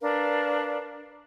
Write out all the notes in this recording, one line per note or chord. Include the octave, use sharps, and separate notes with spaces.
D4 A#4 B4 F5